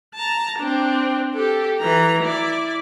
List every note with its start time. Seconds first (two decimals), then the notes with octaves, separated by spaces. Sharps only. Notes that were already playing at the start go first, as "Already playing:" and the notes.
0.15 A5 A#5
0.59 C4 D4
1.34 G4 A4
1.79 E3 A#5
2.23 E4 D5